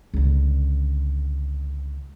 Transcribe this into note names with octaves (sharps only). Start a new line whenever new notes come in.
C#2 D3